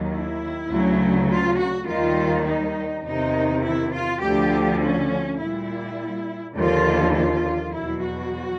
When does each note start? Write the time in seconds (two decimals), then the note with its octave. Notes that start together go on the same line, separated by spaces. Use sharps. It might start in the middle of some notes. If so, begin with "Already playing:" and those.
Already playing: D#2 D#3 F#3
0.11 E4
0.69 D2 C#3 F#3
1.28 F4
1.57 F#4
1.86 D#2 D#3 G3 F4
2.45 D#4
3.03 E2 C3 D#3 D#4
3.63 E4
3.92 F4
4.21 D2 D3 F3 G4
4.80 C#4
5.38 A#2 G3 E4
6.55 D#2 D3 F3 F4
7.14 F4
7.73 E2 B2 F#3 E4
8.02 F#4